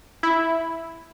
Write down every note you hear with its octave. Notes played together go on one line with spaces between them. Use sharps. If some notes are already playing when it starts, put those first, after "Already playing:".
E4